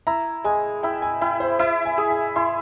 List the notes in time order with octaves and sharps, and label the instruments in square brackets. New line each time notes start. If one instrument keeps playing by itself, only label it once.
[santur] E4 [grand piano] A#5
[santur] G#3 [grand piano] G#5
[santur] E4 [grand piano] G5
[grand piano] G#5
[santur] E4 [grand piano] G5
[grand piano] C5
[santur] E4 [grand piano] E5
[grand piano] G#5
[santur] G#4
[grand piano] G#5
[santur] E4 [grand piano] C6